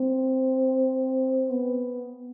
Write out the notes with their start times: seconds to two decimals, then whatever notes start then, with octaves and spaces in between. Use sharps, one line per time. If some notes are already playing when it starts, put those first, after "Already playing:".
Already playing: C4
1.50 B3